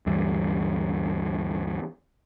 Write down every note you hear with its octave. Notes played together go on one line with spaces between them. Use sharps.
D2 G2 E3 G3